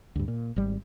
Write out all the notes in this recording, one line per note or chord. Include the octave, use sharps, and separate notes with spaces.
D2 G2
A#2
G#1 G3